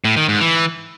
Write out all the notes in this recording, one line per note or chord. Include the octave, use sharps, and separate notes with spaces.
A2
D#3
G#2
E3